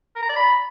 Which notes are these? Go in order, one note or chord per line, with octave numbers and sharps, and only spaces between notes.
A#4
A#5
D5
B5